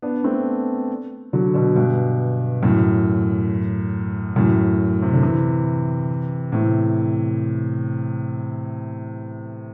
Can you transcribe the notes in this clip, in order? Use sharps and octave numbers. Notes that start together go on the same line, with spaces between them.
B3 D4
A3 C4
D3 F#3
B2 D3
G2 B2
F#2 A2
F#2 A2
C3
D3
C3 E3
A2 C3